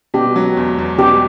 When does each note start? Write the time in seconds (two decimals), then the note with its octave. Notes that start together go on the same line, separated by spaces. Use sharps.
0.14 B2 G4
0.36 F#3
0.57 E2
0.78 E2
0.99 B2 G4